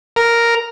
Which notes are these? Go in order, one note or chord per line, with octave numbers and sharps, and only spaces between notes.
A#4